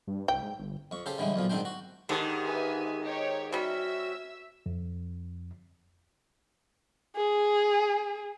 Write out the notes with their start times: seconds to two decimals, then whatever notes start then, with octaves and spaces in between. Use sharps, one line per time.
0.07 G2
0.28 C2 G5
0.43 G#2
0.59 G1
0.91 F2 C#6
1.06 C#3 G4 A4 C5
1.18 A2 D3 E3 G3 G#3
1.34 B1 F2 A#2 F3
1.49 G#2 D#3 C4 D4 C5 G5
1.65 F#4
2.09 G#2 D3 D#3 G4
2.43 B4 E5 G#5
3.01 D#4 G4 C#5
3.52 C3 G3 C#4 F#4 E5 E6
4.66 F2
7.17 G#4